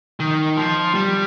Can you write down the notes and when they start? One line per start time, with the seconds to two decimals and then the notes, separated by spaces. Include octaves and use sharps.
0.20 D#3
0.57 F3
0.95 G3